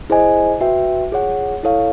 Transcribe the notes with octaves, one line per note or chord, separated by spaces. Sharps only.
E4 G#4 C5 D#5 G#5
F#4 B4 E5 G5
F4 G#4 C#5 F#5
E4 A4 C#5 F5